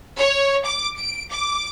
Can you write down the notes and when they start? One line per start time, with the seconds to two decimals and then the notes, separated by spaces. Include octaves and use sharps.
0.18 C#5
0.65 D6
0.97 D7
1.31 D6